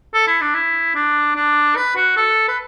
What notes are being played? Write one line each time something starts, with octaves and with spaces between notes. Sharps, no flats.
A4
E4
D4
E4
D4
D4
B4
F#4
A4
B4